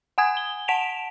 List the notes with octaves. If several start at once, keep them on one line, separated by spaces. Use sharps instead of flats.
F#5 G#5 D#6 G#6
G7
F#5 A5 B6 D7 E7 F7